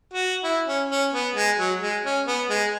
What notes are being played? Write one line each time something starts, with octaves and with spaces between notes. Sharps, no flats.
F#4
E4
C#4
C#4
B3
G#3
F#3
G#3
C#4
B3
G#3